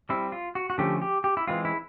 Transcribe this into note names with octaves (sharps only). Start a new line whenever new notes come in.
G3 C4 E4
F4
F#4
F#4
D3 F3 A3 C#4 G4
G4
G4
E4
E3 G#3 C4 F4
E4